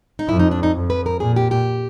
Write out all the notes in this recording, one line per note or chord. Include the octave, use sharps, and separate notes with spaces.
D#4
F2 E4
D#4
D4
D#4
F2
B4
A#4
A#2 G#4
G4
G4